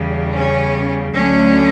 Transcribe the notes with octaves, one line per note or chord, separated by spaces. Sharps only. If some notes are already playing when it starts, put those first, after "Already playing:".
Already playing: E2 C#3 G3
C#4
D2 D3 F#3 A3 C#4